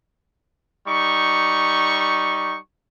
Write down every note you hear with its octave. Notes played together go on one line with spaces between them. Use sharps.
G3 D#4 C#6